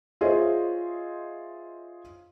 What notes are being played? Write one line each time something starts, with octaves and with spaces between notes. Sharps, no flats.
F4 G#4 C5 C#5 D#5 E5